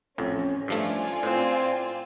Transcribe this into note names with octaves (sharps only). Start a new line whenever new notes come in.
A1 F2 C#4
G2 F3 A3 F4 D5 G#5
A2 C4